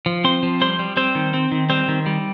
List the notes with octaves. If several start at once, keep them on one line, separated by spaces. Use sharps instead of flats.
F3
C4 C5 C6
F3
G3 C5 C6
G3
G3 C4 C5
D#3
C4
D#3
G3 C4 C5
D#3
G3